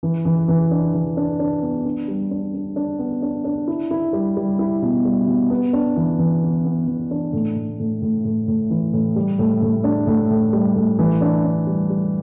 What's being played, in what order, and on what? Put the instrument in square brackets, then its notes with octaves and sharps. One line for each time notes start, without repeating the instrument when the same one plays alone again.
[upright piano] E3
E3
E3
D4
E3
D4
D4
B3
D4
G3
D4
D4
D4
B3
D4
D4
E4
E4
G3
G3
E4
B2
G3
B2
B3
D4
E3
E3
B3
B3
E3
D4
A2
A2
A2
A2
A2
A2
E3
A2
G3
A2
A2
D4
A2
A2
G3
A2
E3
D4
D4
G3
G3